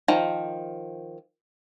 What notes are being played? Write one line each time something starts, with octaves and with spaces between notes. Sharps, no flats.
D#3 F3